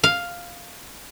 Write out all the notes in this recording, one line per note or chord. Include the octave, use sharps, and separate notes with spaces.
F5